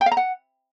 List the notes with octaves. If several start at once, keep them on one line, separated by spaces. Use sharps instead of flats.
G5
F5
A#5
F#5